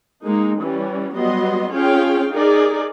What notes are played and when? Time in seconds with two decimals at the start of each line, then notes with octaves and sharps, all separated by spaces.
0.24 G#3 A#3 D#4
0.60 E3 G3 C#4
1.15 F#3 G3 B3 D#5 C6
1.72 C#4 F4 G#4 C#5 F5 G5
2.32 D#4 G#4 A#4 D5